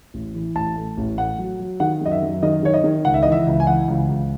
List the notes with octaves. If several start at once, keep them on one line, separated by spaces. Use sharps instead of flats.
A1
E3
A1 A5
A3
A1
A3 F#5
F#3
F#3
D#3 F#5
F#2 D#5
E5
F#2
D#3 D#5
D#3 C#5
D#5
D#3
C#2 F#5
E5
E3 D#5
E5
C#2
G#5
E3 F#5
C#2
C#2